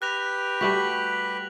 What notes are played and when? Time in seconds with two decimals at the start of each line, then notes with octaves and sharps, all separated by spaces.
0.02 G4 B4 G5 F#6 A#6 F7
0.61 G3 A3 F#4 B6 F#7